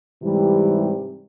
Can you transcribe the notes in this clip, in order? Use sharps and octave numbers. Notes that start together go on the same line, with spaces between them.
G#2 C3 E3 G3 G4